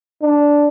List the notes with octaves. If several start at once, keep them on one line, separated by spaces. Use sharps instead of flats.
D4